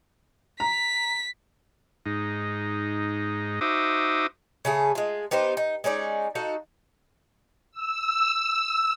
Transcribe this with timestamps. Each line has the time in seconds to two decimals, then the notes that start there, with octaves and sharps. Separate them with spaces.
0.60 A#5 B6
2.06 G#2 D#4
3.61 D#4 F#4 C5 E5 D6 D#6
4.65 C#3 A3 G#4
4.95 G#3 F4
5.31 B3 D#4 G4 C5
5.57 D#4
5.84 G#3 C#4 D#4 D5
6.35 D#4 F#4 A4 F5
7.72 E6